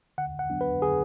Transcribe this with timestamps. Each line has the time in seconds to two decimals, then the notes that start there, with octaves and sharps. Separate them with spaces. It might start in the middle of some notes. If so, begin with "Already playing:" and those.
0.18 D3 F#5
0.39 F#5
0.50 F#3 B3 D4
0.61 B4
0.82 D3 G#4